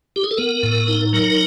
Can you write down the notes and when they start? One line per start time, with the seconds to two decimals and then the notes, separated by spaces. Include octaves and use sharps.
0.16 G4
0.24 G#4
0.31 A4
0.37 B3 A#4
0.63 A2
0.88 D#4
1.13 F#3 A#4